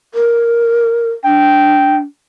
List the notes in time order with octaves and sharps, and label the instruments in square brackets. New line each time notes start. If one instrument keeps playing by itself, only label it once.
[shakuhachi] A#4
[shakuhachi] D4 [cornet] G5